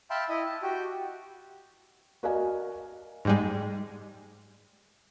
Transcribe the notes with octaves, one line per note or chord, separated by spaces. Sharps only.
E5 F5 G5 A5 B5 C6
E4 D#5
A5
F#4 G4 G5
F#4 A#4 D5 D#5 F5 G#5
G#2 G3 G#3